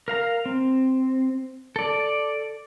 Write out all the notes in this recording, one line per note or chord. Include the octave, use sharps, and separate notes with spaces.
A#4 F5 A#5
C4
A4 D5